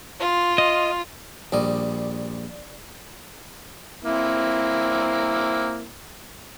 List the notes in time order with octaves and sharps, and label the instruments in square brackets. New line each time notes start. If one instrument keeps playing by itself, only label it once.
[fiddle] F4
[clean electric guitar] D#5
[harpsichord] A#1 G3 D#5 [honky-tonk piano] D5
[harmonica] A#3 C4 E4